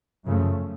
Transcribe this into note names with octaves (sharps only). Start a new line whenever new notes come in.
F#2 C#3 F3 A3